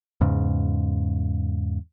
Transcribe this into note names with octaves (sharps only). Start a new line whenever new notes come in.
E2 G#2 C#3